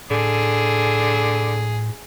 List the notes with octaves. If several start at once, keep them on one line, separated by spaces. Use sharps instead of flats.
A2 D3 G#4